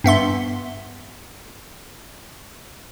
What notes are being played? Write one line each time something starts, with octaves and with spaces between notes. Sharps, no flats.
G2 B3 E5 C6